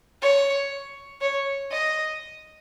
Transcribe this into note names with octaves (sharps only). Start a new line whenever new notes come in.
C#5
C#5
D#5